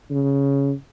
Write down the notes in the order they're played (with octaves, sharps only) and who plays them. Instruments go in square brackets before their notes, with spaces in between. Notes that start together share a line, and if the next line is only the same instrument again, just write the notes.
[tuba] C#3